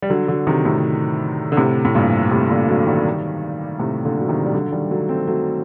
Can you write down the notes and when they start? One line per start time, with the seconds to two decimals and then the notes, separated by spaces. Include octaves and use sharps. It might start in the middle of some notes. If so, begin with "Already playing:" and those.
0.02 G3
0.10 D3 F#3
0.28 D3 F#3
0.47 C3 D#3
0.65 A2 C3
1.52 D3
1.57 A2 C3
1.85 A2
1.95 G2 A#2
2.31 A2 C3
2.50 A#2 D3
2.69 D3 F#3
2.87 D#3 G3
3.79 A2 C3
4.05 A#2 D3
4.20 F#3
4.29 C3 D#3
4.46 G3
4.53 D3 F#3
4.72 D#3 G3
4.91 F#3 A3
5.09 A3 C4
5.27 F#3 A3